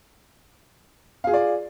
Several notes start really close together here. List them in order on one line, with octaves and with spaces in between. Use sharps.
F5 G#4 F4 D5